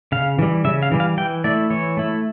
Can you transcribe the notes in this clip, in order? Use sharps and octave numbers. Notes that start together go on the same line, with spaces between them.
C#3 F5
E3 G3
C#3 E5
F5
E3 G3
F5
E3 G5
A3 E4 D5
E3 C#5
A3 E4